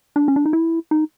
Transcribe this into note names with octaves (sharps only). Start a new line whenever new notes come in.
D4
C#4
D4
D#4
E4
D#4